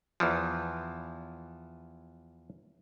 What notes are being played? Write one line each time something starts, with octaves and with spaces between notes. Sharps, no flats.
E2 E3 F3